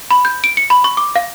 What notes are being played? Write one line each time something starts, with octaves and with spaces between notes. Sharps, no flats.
B5
G6
D7
C#7
B5
C#6
D6
F5